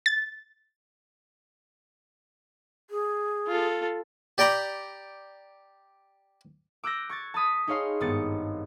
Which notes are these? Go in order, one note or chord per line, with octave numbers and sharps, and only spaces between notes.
A6
G#4
F4 A4
G4 D5 G5 A#5 B5
D6 E6 F#6 G6 A#6
C#6 G#6 A6
A5 B5 D#6 B6
D#4 G#4 C#5 F5 C6
G#1 G2 B3 A6 C#7